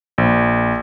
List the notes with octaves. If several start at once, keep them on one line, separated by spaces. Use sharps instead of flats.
A#1